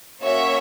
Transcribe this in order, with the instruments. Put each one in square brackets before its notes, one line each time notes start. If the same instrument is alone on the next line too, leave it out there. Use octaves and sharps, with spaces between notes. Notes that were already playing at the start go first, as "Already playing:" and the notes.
[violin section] A#3 C#4 F#4 C#5 E5